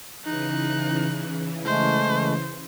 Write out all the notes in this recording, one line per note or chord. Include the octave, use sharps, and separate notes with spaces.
C#3 E3 D#4 F#6
G#3 A3 C5